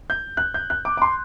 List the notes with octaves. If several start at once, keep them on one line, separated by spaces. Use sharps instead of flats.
G6
F#6
G6
F#6
D6
D6
C6